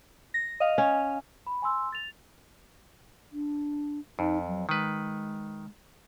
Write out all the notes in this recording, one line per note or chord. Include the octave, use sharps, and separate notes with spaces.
A#6
D#5 F5
C#4
B5
G#5 C6 E6
A6 F7
D4
F2 D#4
F#3
D#3 G#3 B4